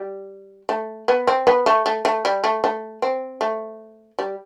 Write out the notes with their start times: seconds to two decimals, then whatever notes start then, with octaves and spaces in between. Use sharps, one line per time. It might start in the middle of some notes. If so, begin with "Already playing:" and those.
Already playing: G3
0.69 A3
1.08 B3
1.27 C4
1.47 B3
1.66 A3
1.86 A3
2.05 A3
2.25 G3
2.44 A3
2.64 A3
3.02 C4
3.41 A3
4.19 G3